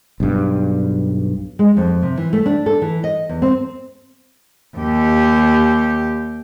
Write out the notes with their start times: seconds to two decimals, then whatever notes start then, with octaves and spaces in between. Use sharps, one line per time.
0.20 B1 G2
1.59 G#3
1.77 F2
2.02 C3
2.17 E3
2.33 A3
2.46 D4
2.66 A4
2.82 E3
3.04 D#5
3.29 E2
3.42 C4
4.77 D#2 G4